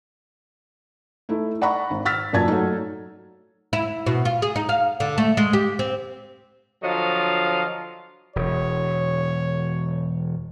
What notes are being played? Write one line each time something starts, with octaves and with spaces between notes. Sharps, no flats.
A3 D#4 E4
D5 F#5 A#5 B5 C#6
G#1
E6 F6 A6 B6
F#2 A#2 D5 A5 G#6
F#3 A3 D#4
E4
B2
F4
G#4
D#4
F5
D3
A3
G#3
G4
C4
D3 F3 F#3 D#5 F5
E1 C#5